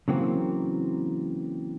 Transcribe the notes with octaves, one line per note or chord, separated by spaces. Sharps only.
C#3 E3 F#3 A#3 C4